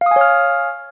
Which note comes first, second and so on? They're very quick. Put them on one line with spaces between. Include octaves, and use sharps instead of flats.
F5 D#6 G#5 C#5 F6